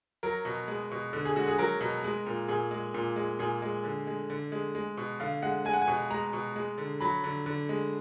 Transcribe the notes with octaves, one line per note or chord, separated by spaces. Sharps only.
F#3 A#4
B2
G#3
B2
D3
G#4
G#3 F#4
G#4
F#3 A#4
B2
G#3
A#2
A#2 G#4
G#3
A#2
G#3
A#2 G#4
G#3
D3
G#3
D3
G#3
G#3
B2
D3 F5
G#3 F#5
G#3 G#5
F#5
G#5
B2
G#3 A#5
B2
G#3
D3
F#3 B5
D3
D3
G#3